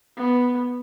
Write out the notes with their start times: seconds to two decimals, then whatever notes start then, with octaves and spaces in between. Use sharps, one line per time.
0.17 B3